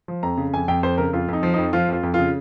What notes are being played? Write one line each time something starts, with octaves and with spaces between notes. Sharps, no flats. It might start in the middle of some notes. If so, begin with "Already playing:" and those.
F3
F2 A#5
C#3
F2 G#5
F2 G5
F2 C5
C#3 A#4
F2 F4
F2 D#4
F3
F2 D#4
F3 F4
F2 F4
F2
C#3 F4